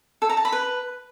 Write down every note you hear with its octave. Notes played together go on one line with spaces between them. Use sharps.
A4
A#5
A5
B5
B4